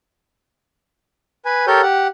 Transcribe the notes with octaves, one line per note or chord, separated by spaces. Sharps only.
B4 G#5
G4 A4 A#4 C#5 G6
G4 F#5